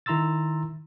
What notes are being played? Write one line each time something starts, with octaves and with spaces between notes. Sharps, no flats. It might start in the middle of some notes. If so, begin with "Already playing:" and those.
D#3 E4 A#5 C6 E6 A6